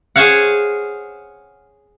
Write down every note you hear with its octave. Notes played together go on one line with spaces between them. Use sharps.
G#4 C5 C#5 F5 F#5